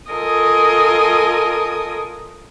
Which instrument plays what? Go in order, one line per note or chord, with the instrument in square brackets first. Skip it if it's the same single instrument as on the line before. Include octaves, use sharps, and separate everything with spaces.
[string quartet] F4 A4 A#4 D#5 G#5 D#6